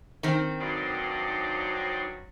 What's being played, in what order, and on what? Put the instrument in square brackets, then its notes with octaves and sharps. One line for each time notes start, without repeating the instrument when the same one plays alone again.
[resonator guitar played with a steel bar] D#3 C4
[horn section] G2 F#3 [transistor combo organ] D#4 C5 D5